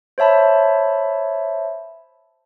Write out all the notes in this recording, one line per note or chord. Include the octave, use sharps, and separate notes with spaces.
C5 C#5 E5 A5 B5